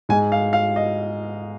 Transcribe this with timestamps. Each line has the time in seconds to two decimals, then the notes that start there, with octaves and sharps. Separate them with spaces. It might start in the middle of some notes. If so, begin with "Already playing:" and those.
0.09 G#2 G#3 G#5
0.32 F5
0.53 F5
0.76 D#5